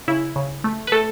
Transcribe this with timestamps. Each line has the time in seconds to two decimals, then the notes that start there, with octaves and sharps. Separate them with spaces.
0.08 C#3 E4
0.36 C#3
0.64 A3
0.87 B4
0.92 A3 A4